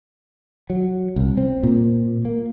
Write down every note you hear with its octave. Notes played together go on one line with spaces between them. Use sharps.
F#3
C2
C4
A#2
A#3